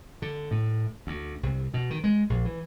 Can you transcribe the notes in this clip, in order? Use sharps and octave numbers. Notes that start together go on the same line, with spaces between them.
D3
A2
D2
C2
B2
D#3
G#3
A#1
E3